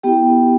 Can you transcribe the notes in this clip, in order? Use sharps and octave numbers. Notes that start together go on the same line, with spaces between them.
B3 E4 G4 G5